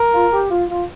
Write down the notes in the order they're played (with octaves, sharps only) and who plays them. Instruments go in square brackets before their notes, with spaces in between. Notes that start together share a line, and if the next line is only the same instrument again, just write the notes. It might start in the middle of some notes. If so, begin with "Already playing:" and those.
Already playing: [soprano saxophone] A#4
[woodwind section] F4
G4
F4
F4